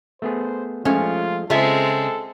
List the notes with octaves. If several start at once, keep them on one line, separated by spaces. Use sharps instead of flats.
A3 B3 G#4 C5
F3 G#3 A3 C#4 F4
C#3 G#3 C4 F4 G#4 A4 E5